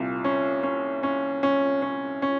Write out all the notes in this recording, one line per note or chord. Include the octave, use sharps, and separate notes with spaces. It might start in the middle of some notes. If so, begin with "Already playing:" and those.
Already playing: C2 A#2
C#4
C#4
C#4
C#4
C#4
C#4